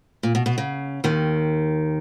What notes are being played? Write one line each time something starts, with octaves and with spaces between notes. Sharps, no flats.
A#2
B2
B2
C#3
D#2 D#3